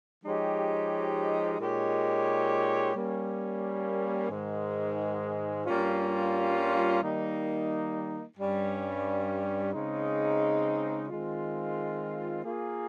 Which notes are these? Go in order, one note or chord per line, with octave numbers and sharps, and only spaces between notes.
F3 G#3 D#4 G4 C#5
A#2 G#3 D#4 G4 C#5
G3 A#3 C#4
G#2 D#3 G#3
G2 G3 A#3 C#4 F4
D#3 G3 A#3 D#4
G2 G3 C#4
C#3 G#3 C4 D#4
D#3 G#3 C4 F4
A#3 F4 G#4